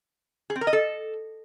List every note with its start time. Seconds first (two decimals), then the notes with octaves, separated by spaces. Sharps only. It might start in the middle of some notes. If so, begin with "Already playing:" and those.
0.50 G#4
0.56 C4
0.61 A#4
0.67 D#5
0.73 A4